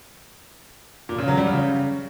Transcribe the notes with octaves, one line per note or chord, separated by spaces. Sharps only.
A#2
C#3
F#3
G3
C#3